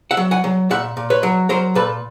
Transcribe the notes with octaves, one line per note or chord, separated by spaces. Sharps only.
E5 F#5
F#3
F#5 G#5
F#3
A#2 E5 F#5
A#2
B4 C#5
F#3
F#3 A#4 C5
A#2 A4 B4